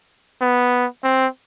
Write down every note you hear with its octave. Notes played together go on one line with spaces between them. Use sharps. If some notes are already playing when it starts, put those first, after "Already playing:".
B3
C4